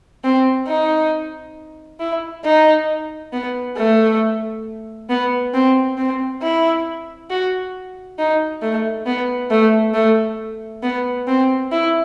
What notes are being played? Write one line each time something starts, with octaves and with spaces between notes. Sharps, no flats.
C4
D#4
E4
D#4
B3
A3
B3
C4
C4
E4
F#4
D#4
A3
B3
A3
A3
B3
C4
E4